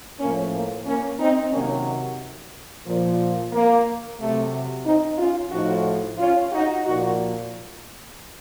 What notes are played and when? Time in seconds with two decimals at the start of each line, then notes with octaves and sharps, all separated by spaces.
0.19 A2 F3 A#3 C#4
0.52 A#3
0.86 A#3 C#4
1.19 C4 D#4
1.52 C3 D#3 F#3 A#3 C#4
2.86 A#2 F3
3.52 A#3
4.18 C3 F#3 A3
4.85 C4 D#4
5.18 C#4 F4
5.51 A2 F3 D#4 F#4
6.18 C#4 F4
6.51 D#4 F#4
6.84 A#2 F3 D#4 F#4